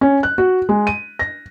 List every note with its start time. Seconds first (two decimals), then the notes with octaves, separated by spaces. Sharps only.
0.01 C#4
0.23 F#6
0.38 F#4
0.69 G#3
0.87 D#7
1.19 A#6